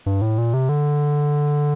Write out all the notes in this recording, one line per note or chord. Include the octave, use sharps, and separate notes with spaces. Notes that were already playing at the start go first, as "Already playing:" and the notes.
G2
A2
A#2
C3
D3